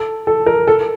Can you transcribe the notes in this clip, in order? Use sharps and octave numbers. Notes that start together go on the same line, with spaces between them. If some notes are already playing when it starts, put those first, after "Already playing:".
Already playing: A4
A4
A#4
A4